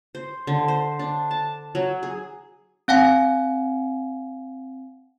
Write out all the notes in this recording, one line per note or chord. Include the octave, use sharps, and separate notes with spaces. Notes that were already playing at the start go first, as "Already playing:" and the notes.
C5
D3
C5
D4
A5
F#3
G#4
C4 F5 F#5 G#5